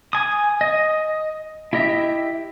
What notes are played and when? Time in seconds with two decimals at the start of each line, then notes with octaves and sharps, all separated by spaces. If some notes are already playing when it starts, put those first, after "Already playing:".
0.13 G#5 D#6
0.61 D#5
1.73 E4 G4 D#5 E5